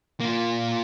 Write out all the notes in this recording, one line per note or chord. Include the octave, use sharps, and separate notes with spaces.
A#3 F4